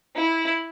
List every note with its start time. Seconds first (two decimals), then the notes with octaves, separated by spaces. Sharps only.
0.16 E4